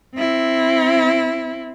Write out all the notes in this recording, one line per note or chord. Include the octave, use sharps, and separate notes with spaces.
C4 E4